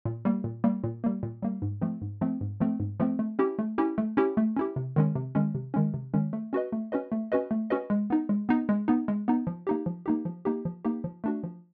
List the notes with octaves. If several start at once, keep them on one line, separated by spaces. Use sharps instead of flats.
A#2
G3 A#3
A#2
G3 A#3
A#2
G3 A#3
A#2
G3 A#3
G#2
F3 A3 C4
G#2
F3 A3 C4
G#2
F3 A3 C4
G#2
F3 A3 C4
A3
C#4 E4 G4
A3
C#4 E4 G4
A3
C#4 E4 G4
A3
C#4 E4 G4
C3
D#3 G#3 C#4
C3
D#3 G#3 C#4
C3
D#3 G#3 C#4
C3
D#3 G#3 C#4
A3
C#4 F#4 B4 D#5
A3
C#4 F#4 B4 D#5
A3
C#4 F#4 B4 D#5
A3
C#4 F#4 B4 D#5
G#3
B3 D#4
G#3
B3 D#4
G#3
B3 D#4
G#3
B3 D#4
F3
A#3 D#4 G4
F3
A#3 D#4 G4
F3
A#3 D#4 G4
F3
A#3 D#4 G4
F3
A3 D4 F#4
F3